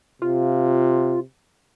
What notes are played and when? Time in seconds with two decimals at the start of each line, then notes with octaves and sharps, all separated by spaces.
0.22 C3 F4